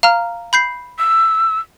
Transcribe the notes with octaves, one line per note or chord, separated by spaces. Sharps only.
F5 A#5 F6
B5 G6 C7
E6